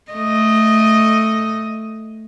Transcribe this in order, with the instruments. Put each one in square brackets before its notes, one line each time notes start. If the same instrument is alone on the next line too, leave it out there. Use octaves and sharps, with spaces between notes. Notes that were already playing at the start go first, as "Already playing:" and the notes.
[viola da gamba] A3 D#5